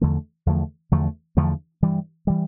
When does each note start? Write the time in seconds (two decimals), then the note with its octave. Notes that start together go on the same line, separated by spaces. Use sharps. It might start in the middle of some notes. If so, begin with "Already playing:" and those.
0.01 E2 D3 F3 A3
0.46 E2 D3 F3 A3
0.92 E2 D3 F3 A3
1.37 E2 D3 F3 A3
1.82 G2 E3 G3
2.27 E3 G3